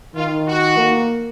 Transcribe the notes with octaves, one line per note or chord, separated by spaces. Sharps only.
D#3 F4
F#4
A#3